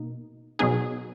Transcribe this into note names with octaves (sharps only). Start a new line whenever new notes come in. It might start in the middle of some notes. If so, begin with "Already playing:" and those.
Already playing: B2 A#3 D#4
B2 F#3 B3 D#4 G#4